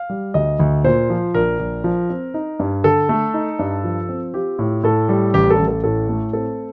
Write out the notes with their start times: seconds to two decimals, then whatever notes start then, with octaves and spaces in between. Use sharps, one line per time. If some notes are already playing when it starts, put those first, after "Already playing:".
Already playing: F5
0.10 G3
0.34 D2 D#5
0.59 D2
0.84 A#2 C5
1.10 F3
1.35 A#1 A#4
1.59 A#1
1.84 F3
2.10 C4
2.34 D#4
2.59 G2
2.84 D3 A4
3.09 A3
3.34 D#4
3.59 G2
3.84 F3
4.09 C4
4.34 F4 G4
4.59 A2
4.83 A2 A4
5.09 G3
5.34 A1 G4
5.50 A4
5.59 A1
5.68 A4
5.84 A2 A4
6.09 A3
6.33 C4 A4